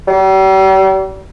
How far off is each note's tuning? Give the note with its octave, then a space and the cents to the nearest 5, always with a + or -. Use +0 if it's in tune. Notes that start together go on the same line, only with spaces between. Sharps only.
G3 -40